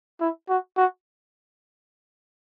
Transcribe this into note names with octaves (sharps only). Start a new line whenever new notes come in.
E4
F#4
F#4